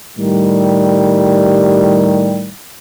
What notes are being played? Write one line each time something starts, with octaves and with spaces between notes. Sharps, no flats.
A2 D#3 G3